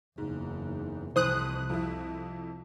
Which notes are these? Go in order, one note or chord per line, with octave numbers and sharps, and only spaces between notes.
F#1 E2 G#2
C2 F2 C3 E3 C5 D#6 F#6
F2 F3 E4